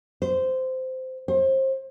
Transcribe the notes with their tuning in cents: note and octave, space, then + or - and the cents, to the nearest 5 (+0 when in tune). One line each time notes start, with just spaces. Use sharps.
C5 -15
C5 +30